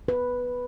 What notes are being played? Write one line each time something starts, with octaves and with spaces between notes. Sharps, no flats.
B4